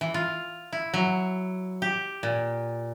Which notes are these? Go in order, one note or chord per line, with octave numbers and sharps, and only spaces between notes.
E3
F4
E4
F#3
G4
A#2